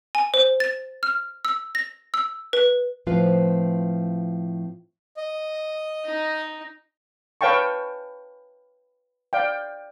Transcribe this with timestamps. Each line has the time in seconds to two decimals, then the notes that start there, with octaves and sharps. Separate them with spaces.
0.15 G#5
0.34 C5
0.60 A6
1.03 F6
1.45 E6
1.75 A#6
2.14 E6
2.53 B4
3.07 A2 F3 C4 F4 B4 F5
5.17 D#5
6.06 D#4
7.41 B4 C#5 F5 G5 A5 C#6
9.33 D5 F5 G5